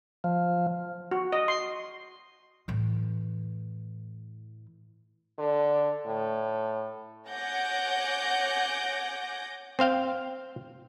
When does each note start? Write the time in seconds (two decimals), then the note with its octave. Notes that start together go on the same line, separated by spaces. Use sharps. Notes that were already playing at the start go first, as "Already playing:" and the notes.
0.24 F3
1.11 F#4
1.33 D#5
1.48 C6
2.68 A2 E3
5.38 D3
6.06 A2
7.29 C#5 F#5 G#5 D6 G6 A#6
9.79 C4 C5 F5 G5